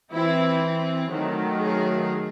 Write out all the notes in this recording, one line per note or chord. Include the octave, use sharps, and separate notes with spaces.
E3 C4 E4
D#3 F#3 A3
G#4